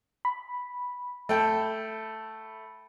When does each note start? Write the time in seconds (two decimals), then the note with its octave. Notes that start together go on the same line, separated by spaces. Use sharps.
0.25 B5
1.29 A3 G5 A5